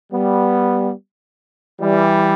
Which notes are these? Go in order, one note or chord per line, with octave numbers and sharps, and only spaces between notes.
G3 B3
E3 G3